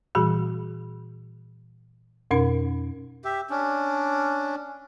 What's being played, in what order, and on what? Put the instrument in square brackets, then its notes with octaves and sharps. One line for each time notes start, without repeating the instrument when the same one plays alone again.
[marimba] A#2 E3 G3 F#4 G#4
F2 B2 C#4 A#4
[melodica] G4 E5
C#4 D4